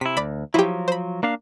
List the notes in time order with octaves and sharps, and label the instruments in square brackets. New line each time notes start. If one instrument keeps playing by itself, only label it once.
[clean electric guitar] C3 E4 [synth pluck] B6
[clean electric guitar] D2 [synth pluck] D5 B5
[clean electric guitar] F3 F#3 [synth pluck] E4 G4
[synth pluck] C5 B5
[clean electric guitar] A#3 D4 F5